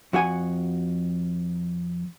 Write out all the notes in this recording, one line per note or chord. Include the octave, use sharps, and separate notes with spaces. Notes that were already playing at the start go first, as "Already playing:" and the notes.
F2 F#4 F#5 G#5